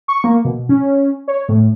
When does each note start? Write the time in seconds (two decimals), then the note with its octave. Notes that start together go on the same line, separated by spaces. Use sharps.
0.08 C#6
0.24 A#3
0.45 B2
0.69 C#4
1.28 C#5
1.49 A2